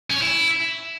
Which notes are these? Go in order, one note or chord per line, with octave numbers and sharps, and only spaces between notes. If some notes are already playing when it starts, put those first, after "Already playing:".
C#4
C#5
E4